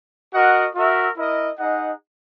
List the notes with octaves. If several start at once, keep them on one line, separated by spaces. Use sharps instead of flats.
F#4 A#4 D#5 F#5
F#4 A#4 E5
E4 A#4 D#5
D#4 G#4 D#5 F#5